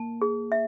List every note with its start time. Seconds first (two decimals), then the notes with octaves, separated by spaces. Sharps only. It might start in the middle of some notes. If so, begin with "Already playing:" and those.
Already playing: A#3 A5
0.22 G#4
0.52 E5